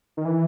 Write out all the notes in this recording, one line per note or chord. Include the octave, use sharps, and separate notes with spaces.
D#3
E3